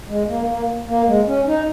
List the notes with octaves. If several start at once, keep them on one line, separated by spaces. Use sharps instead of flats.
G#3
A#3
A#3
A#3
G#3
C#4
D#4